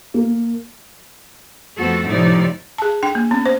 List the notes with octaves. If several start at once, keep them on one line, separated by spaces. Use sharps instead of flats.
A#3
F2 A3 B3 C4 F#4 A4
A2 C3 F3 D#4 E4 D5
G#4 A5
D4 G5
A#3
B3 C#4
C5